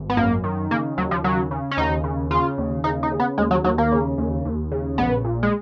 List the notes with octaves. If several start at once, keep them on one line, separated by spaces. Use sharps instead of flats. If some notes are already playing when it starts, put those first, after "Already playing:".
Already playing: G#1
B3
F#2 A#3
D#3
C#3 A#3
D#2 F#3
F3
C#3 F#3
C#3
C#4
D#2 D#4
C#3
C#3 F4
D#2
C#3 D#4
D#4
C#3
B3
D#2 G#3
F#3
D#2 F#3
A#3
C#3
D#2
D#2
C#3
A#1 B3
A#2
G#3